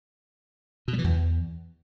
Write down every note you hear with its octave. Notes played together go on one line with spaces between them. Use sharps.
B2
G3
E3
E2